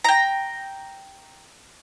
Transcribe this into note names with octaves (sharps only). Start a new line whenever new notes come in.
G5 A#5